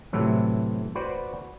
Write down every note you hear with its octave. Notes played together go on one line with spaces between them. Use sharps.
A2 C3 E3 F#3
F#4 B4 C5 D5 G5